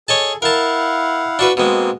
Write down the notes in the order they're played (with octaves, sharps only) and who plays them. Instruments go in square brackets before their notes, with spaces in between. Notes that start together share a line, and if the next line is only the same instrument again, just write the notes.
[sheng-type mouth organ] G#4 A4 [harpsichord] C#5 D#5 A5
[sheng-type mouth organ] E4 F5 F#5 [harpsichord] A#4 A5
[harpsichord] D4 F#4 B4
[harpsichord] B2 G#3 [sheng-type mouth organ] A#3 C4